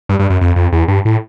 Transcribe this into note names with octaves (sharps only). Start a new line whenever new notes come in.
G2
G2
F#2
F2
F2
E2
G2
A2